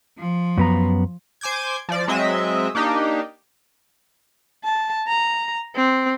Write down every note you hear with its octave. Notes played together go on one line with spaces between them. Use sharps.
F3
F#2 B3 A#5
C5 G#5 D6 G6 G#6
F3 D5
F#3 G#3 C4 D#5 E5
A#3 D4 D#4 G4
A5
A#5
C4